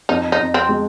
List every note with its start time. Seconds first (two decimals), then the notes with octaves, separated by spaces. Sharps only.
0.09 F2 D#4
0.32 D#4
0.39 F2
0.54 C4
0.69 G#3